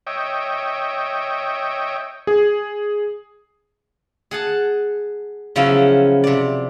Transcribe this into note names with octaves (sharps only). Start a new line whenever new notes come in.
C#5 D#5 E5 G5
G#4
G#4 F#5 A5
C#3 F3 F#3 B3 C#4 E4
C3 D5